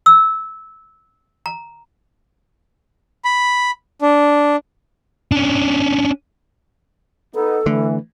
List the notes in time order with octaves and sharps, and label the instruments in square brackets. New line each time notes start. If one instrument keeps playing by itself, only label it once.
[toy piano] E6
A#5
[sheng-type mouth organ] B5
D4
[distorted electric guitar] C#4 D4
[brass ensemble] B3 D#4 [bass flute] A4
[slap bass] D3 [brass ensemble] E3 [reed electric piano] A3